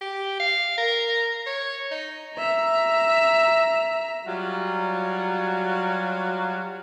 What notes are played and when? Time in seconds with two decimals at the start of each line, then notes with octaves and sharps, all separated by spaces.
0.01 G4
0.40 F5
0.78 A#4
1.47 C#5
1.92 D#4
2.35 E5 A#5
4.27 F#3 G3 F4 F#4